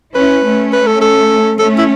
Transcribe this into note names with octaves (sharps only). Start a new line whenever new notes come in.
C#4 E4 B4
A3 C#4
B4
A4
A4
A3 C#4 A4
E4